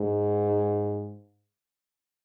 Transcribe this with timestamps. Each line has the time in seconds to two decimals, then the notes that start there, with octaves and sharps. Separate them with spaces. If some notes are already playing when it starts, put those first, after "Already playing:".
Already playing: G#2